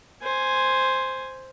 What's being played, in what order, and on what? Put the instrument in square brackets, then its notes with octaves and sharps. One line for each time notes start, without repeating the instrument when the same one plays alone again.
[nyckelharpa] C5 G#5